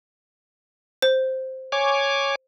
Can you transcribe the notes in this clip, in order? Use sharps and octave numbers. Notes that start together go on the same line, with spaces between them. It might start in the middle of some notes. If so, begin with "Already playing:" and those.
C5
C#5 G#5 D6